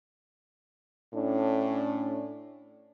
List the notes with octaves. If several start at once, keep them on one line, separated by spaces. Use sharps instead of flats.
A2 C#4 D4